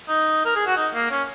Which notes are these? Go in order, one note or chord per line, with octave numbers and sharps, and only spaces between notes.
D#4
A#4
G#4
F#4
D#4
A#3
C#4